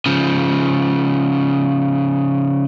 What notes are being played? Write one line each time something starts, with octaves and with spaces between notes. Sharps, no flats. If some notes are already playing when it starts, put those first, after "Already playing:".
C#3 F3